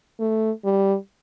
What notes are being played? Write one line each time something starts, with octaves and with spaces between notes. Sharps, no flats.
A3
G3